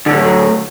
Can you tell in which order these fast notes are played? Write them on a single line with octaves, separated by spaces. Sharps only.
D3 A2 G3 A3 F#3